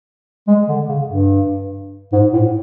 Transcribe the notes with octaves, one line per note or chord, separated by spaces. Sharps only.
G#3
D3
C#3
G2
G#2
A2